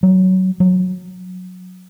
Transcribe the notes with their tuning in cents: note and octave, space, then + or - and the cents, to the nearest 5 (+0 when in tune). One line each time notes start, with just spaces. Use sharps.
F#3 +15
F#3 -15